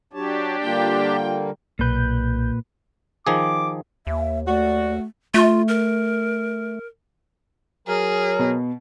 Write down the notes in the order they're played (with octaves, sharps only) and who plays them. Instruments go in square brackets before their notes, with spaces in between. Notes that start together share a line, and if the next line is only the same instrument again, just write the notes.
[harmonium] F#3 C#5 A5 [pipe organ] D4 G4
[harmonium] D3 G3 A#3 [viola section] F4 G5
[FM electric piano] B1 G6 [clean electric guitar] A#2 B4
[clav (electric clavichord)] D#3 F3 G#4 [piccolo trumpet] D6
[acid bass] D#2 [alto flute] A#3 [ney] E5
[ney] A3 [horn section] F#4 [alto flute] D5
[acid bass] A3 [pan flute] F4
[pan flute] A#4
[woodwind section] F#3 A#4 [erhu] G#4
[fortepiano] B2